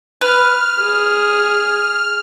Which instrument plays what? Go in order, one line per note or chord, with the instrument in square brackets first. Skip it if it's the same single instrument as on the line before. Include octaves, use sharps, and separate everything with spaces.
[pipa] B4 [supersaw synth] F6
[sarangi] G#4